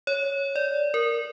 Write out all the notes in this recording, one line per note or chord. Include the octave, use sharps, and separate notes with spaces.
C#5
D5
A#4